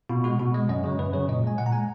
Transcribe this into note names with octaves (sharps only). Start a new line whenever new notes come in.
B2 F4
G#3 F#4
B2 F#4
G#3 D#5
F#2 D#5
C#3 F#3
F#2 B4
C#3 F#3 C#5
A#2 D#5
G#3 G#5
A#2 F#5
A#5
G#3 G#5